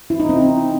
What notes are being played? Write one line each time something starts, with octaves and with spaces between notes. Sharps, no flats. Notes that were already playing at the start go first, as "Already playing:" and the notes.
E4
D#4
C4